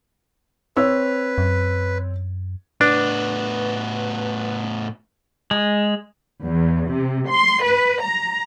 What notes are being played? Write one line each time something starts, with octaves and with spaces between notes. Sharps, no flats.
C4 B4 C#5 E6
F#2
A2 B3 D4 B4
G#3
E2
C3
C6
B4
A#5